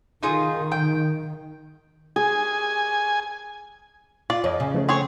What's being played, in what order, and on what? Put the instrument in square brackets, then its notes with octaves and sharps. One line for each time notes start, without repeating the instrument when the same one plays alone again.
[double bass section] D#3 [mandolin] D#4 F4 G#4
[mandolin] G5
[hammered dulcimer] G#4 [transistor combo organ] G#5
[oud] F4 [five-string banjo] D5
[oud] F2 [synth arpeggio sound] C#5 D#5
[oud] C#3
[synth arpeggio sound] F3 A3 C#4
[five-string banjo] C4 G#4 C#5